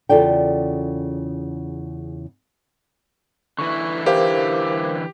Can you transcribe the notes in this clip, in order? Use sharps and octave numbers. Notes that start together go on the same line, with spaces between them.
E2 C#3 F4 A4 D5 G5
D3 E3 E4 C#6
G4 A#4 C5 F5